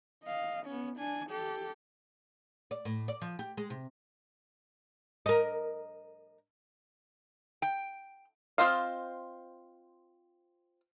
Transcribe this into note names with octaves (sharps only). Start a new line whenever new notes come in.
D#5 F5
B3 C#4
D4 G#5
G4 A4
D5
A2
D5
F3
G4
G#3
C3
A#4 D#5
G5
C4 F4 C5 D#5 F5